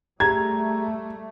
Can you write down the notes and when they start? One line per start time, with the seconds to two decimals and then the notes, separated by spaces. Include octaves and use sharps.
0.20 G3 A3 G4 G#4 A#5 G#6